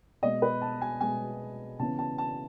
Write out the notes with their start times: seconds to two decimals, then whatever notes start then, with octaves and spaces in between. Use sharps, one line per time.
0.22 B2 G#3 B3 D#5
0.42 B4
0.62 A5
0.81 G#5
1.01 B2 G#3 B3 G#5
1.79 C#3 E3 B3 A5
1.99 A5
2.18 A5